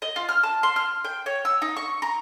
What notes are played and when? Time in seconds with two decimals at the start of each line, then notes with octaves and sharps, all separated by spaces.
0.02 D#5
0.16 F4
0.29 F6
0.43 A5
0.63 C6
0.76 F6
1.04 G5
1.26 C#5
1.45 E6
1.62 D#4
1.77 C#6
2.02 A#5